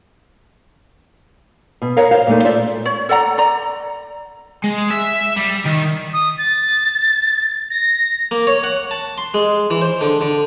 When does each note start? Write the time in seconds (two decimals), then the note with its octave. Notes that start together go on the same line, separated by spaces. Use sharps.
1.82 B2
1.97 A#4 C#5 D#5 F5
2.11 C5 F5
2.27 A#2 G#3 A3 D#4
2.44 F4 C5 D5 E5
2.86 C#5
3.09 A4 D5 F#5 A#5
3.38 D5 A#5
4.64 G#3
4.91 E5
5.37 G3
5.66 D#3
6.13 D#6
6.38 A6
7.70 A#6
8.31 A#3
8.47 C#5
8.64 F#5
8.91 A5
9.18 C6
9.34 G#3
9.70 E3
9.82 C5
10.01 D3
10.21 D3